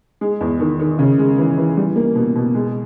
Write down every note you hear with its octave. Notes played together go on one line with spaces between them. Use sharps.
G#3
E2
D#3
D#3
C#3
G#3
E3
E3
G3
A#3
B2
B2
G#3